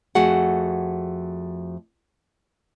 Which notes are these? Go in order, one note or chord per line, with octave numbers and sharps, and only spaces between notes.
F2 A3 F#4 G#4 F#5